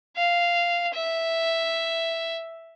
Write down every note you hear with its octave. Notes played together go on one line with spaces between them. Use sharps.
F5
E5